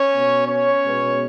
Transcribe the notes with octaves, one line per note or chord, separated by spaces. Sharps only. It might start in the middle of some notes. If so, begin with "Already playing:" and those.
Already playing: C#4 C#5
B2 B3
C#4 C#5
B2 G#3 B3